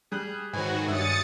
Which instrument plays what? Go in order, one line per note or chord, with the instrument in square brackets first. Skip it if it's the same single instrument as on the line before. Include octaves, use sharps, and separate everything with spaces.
[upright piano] G3 F#6 F#7 [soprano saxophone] G#4
[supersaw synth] G#2 D#3 [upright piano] F#3 B4 C#5 [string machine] F#4 [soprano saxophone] G#5
[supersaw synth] G2 [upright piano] C#5 E5 [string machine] D#6 A6 C#7